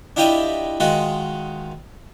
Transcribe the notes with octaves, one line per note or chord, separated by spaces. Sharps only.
D4 E4 F4 G4 D#5 E5
D#3 G#3 F4 F#4